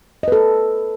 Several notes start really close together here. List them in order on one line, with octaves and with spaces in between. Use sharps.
D#5 B4 A4